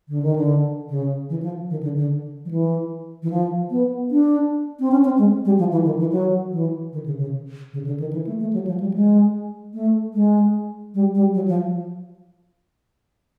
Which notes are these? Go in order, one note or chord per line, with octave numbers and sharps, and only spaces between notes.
D3
D#3
D3
C#3
E3
F3
D#3
D3
D3
F3
E3
E3
F3
B3
D4
C4
C#4
C4
G#3
G3
F3
E3
D#3
E3
F#3
E3
D#3
C#3
C#3
C#3
D3
D#3
E3
A3
A3
F#3
F3
G3
G#3
A3
G#3
G3
G3
F#3
F3